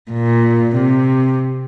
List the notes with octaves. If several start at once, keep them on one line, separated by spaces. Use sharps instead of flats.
A#2
C3